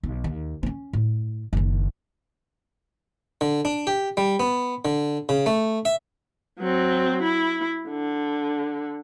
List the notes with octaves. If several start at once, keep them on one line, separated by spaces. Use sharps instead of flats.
B1
D#2
C4 C#4
A2
F#1 D#3
D3
D4
G4
G3
B3
D3
C#3
A3
E5
F#3 C4
E4
D3